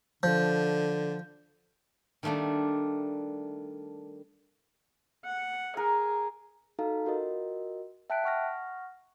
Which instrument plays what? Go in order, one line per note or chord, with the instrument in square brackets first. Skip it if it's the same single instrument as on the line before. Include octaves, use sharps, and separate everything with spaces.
[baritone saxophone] D3 [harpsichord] F3 [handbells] G6
[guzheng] D#3 G3 A3 A#3 D4
[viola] F#5
[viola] G#4 [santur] A#4
[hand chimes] D#4 F#4 A4 F5 A#5
F4 F#4 A#4 D#5
E5 G5 A5 F#6 B6 D7
F#5 C#6 F6 A#6